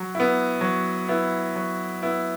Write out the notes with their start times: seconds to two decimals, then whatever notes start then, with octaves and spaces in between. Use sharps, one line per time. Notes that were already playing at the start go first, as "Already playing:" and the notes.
Already playing: F#3
0.15 B3 E4
0.61 F#3
1.09 B3 E4
1.56 F#3
2.02 B3 E4